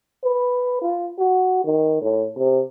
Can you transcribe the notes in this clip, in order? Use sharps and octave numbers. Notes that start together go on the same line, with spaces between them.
B4
F4
F#4
D#3
A2
C3